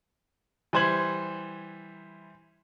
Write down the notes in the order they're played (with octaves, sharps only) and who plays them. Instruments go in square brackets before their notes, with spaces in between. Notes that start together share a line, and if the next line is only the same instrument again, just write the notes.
[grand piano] E3 G3 C5 G#6 F#7